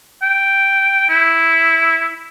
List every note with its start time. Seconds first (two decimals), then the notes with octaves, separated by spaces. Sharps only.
0.22 G5
1.09 E4